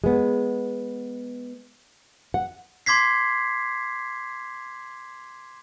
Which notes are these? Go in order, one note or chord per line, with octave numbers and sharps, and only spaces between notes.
G#3 B3
F#5
C6 D6 G#6 B6 C7